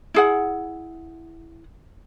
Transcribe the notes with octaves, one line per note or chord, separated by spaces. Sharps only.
E4 G#4 F#5